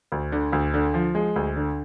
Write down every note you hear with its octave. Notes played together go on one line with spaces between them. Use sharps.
D2
D3
D2
D3
F3
G#3
D2
D3